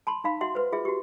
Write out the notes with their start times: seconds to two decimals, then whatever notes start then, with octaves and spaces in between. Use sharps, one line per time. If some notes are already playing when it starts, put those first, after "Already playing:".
0.07 A5 B5 C6
0.24 D#4 F5 B5
0.41 F#4 E5 F#5 C6
0.55 B4 C5
0.72 F4 G#4 E5
0.85 F#4 G4